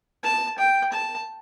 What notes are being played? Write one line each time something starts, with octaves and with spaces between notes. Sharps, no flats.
A5
G5
A5